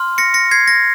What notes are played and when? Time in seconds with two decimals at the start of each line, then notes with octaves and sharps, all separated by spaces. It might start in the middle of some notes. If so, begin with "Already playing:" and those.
Already playing: C6 F6
0.18 A#6 C#7
0.34 A#6 C#7
0.51 G#6 C7
0.68 A#6